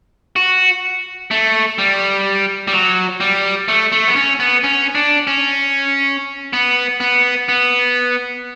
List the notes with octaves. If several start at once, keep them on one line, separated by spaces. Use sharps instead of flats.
F#4
A3
G3
G3
F#3
G3
A3
A3
B3
C#4
B3
C#4
D4
C#4
B3
B3
B3